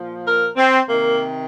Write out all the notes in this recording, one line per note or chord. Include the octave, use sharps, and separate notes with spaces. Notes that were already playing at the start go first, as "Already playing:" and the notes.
Already playing: A#2 F3
A#4
C4
C3 D#3 A#3